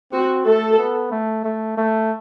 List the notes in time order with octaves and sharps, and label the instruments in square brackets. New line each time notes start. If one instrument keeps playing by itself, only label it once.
[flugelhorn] C4 [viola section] F#4
[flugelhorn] A3 [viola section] A4
[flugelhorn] B3
A3
A3
A3